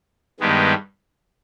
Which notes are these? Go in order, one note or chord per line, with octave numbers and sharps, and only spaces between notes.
G2 D#3 G#3 B3 G4